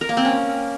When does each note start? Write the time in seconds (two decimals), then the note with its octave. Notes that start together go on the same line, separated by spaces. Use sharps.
0.01 A#4
0.09 A#3
0.17 C4
0.25 C#4